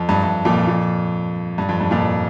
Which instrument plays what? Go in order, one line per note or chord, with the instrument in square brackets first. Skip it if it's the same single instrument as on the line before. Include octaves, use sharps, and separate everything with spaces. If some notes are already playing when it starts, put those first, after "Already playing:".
Already playing: [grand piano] F2
G2
G2
F2 A#2
F2 A#2
G2
F2
G2
F2 A#2